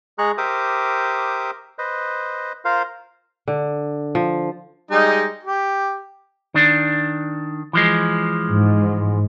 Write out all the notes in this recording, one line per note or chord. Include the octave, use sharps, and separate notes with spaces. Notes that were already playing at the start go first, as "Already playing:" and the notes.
G#3 G#4 A#5 C#6 F#6
G4 A#4 C5 E5 D6 D#6
B4 C5 D#5
F4 A#4 C5 F5
D3
F3
G3 G#3 D#4
G4
D#3 D4
E3 F3 G#3
G#2